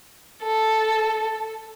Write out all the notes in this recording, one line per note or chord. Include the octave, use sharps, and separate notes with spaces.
A4